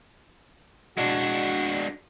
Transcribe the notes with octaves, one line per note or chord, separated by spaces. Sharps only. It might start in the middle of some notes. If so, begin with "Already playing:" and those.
G#3 D4 F#4